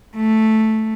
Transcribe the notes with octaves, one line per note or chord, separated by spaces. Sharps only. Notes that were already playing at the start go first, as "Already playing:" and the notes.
A3